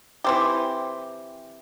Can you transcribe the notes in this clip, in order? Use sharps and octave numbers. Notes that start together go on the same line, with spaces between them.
E3 C4 G4